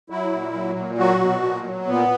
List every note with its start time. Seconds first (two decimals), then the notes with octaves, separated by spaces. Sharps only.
0.10 F#3 E4
0.32 A#2
0.54 F#3
0.76 A#2
0.98 F#3 F#4
1.20 B2
1.43 A#2
1.64 F#3
1.87 A#2 B3